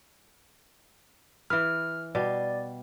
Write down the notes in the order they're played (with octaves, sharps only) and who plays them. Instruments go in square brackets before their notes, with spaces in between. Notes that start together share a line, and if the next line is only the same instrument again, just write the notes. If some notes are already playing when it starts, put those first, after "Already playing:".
[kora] E3 G#4 B4 [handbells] F6
[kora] B2 G3 F5 [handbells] D5